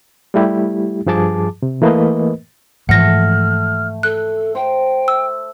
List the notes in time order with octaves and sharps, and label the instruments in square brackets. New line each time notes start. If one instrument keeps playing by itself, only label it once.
[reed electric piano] G3 A3 E4 G4
G2 F3 G#4 A5 D6
C3
E3 A3 A#3 A#4 B4 D#5
[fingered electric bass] G#2 E3 F3 [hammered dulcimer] A3 [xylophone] F#5 A#6 [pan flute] F6
[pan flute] A4 [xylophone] F#6
[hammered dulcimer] C5 [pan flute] G5
[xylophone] E6